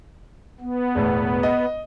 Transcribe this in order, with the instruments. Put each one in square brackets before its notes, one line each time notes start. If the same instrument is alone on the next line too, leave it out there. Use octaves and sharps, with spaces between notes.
[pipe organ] B3
[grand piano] E1 E2 A2
D#5